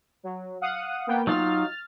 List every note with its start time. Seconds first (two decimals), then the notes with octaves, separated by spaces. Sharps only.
0.23 F#3
0.61 F5 F#5 D#6
1.07 A#3 B3 G5
1.27 F#3 D#4 F4 F6 A6